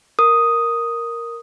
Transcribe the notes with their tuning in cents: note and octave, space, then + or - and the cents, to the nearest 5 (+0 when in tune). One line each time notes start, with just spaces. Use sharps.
A#4 +0 D#6 +0